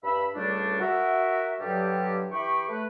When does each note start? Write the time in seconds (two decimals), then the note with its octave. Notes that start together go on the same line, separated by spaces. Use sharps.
0.04 G2 E5 B5
0.35 C#2 A2 G3 A3 D4
0.81 F#4 A#4 E5
1.60 G2 D3 F#3 G3 G4
2.32 E3 E4 G4 G5 B5 C#6
2.69 A3 B4